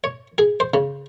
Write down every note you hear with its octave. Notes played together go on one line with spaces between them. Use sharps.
C#5
G#4
C5
C#3